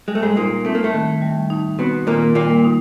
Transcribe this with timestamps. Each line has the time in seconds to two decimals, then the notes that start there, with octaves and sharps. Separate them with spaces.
0.08 G3 G#3
0.15 A3
0.22 G#2 G#3
0.36 A#2 A#3 D#4
0.65 A3 C4
0.75 A#3
0.84 A2 A3
0.94 D#3
1.22 G3
1.50 D#4
1.79 B2 B3 C4
2.07 A#2 D#3 A#3
2.35 A#2 G3 A#3
2.64 D#4